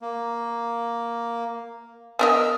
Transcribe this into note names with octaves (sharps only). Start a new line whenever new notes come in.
A#3
B3 A#4 D#5 E6 F6